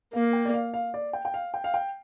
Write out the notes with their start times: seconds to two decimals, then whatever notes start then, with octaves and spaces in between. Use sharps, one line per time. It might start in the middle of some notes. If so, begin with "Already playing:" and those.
0.13 A#3 F5
0.33 G5
0.45 D5
0.54 F5
0.74 F5
0.94 D5
1.13 G5
1.25 G5
1.34 F5
1.54 G5
1.64 F5
1.74 G5